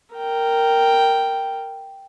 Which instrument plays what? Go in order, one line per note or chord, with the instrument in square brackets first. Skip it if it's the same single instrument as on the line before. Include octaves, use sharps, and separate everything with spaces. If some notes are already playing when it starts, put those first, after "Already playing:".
[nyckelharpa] A#4 G5